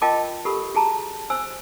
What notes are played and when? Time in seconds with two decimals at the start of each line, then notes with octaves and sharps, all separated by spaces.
0.02 F4 A#4 D#5 G5 A5 D6
0.45 G4 A4 A#4 B5
0.75 F#4 G#4 A5 A#5
1.30 C5 G#5 E6